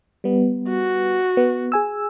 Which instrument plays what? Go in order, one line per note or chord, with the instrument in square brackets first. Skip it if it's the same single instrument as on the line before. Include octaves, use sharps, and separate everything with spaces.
[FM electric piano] G3 B3
[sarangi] F#4
[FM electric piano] B3
G#4 G#5 E6